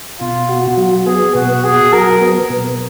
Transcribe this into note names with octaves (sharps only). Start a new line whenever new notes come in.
B2 F4
F#4
F#3
B3 G#4
B2 F#4
F#4 G#4
F#3 A#4
B3
B2